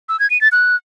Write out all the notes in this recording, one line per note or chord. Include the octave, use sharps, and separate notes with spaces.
E6
G#6
D#7
A6
F#6